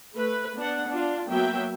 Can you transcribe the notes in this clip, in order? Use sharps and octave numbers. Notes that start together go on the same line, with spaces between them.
A3 B4
B3 D4 F#5
D4 F4
F#3 A#3 B3 E5 G5